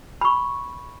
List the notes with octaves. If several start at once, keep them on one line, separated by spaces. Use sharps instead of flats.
B5 C#6